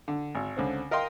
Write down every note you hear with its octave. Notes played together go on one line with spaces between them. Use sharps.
D3
G#1
C#2 D3 C4
A#4 D#5 F5 G5 C6